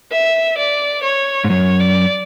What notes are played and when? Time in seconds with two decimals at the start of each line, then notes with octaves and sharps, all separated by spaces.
0.12 E5
0.58 D5
1.03 C#5
1.44 G#2
1.50 F#2 C#5
1.80 D5